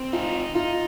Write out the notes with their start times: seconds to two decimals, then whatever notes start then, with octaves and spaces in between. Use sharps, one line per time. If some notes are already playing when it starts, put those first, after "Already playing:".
Already playing: C4
0.13 D#4 F4
0.55 D#4 F4